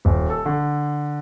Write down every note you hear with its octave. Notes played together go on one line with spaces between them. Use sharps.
D#1
A4
D3